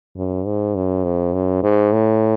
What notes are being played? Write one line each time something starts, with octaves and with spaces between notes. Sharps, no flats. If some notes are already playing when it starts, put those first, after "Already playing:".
F#2
G#2
F#2
F2
F#2
G#2
A2